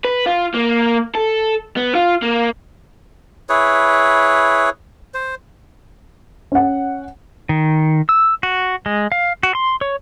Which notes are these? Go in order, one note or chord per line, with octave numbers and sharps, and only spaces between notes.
B4
F4
A#3
A4
B3
F4
A#3
E4 G#4 B4 C#5
C5
C#4 F#5
D#3
E6
F#4
G#3
F5
F#4
C6
C#5